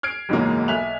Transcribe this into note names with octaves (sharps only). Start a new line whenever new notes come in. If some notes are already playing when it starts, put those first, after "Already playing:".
F6 G#6 C7 D7
F#1 E2 G#2 F#3 G#3 A#3
B1 E5 G#5 F#6 F7